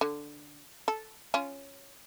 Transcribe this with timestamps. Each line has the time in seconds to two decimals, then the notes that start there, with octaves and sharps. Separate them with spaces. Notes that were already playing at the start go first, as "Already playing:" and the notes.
0.01 D3
0.88 A4
1.34 C#4 F4